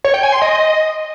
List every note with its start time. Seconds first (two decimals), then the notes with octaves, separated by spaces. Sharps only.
0.04 C#5
0.14 G5
0.23 G#5
0.32 C6
0.42 D#5